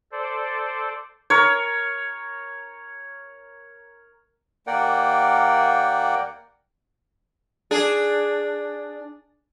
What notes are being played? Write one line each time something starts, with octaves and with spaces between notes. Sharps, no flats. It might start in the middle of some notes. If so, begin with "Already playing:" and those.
A4 C5 D5
A#4 C#5
D#2 A#3 A#4 D5 F#5 G5
D4 G#4